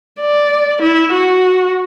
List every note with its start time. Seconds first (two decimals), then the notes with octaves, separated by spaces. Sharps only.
0.20 D5
0.82 E4
1.13 F#4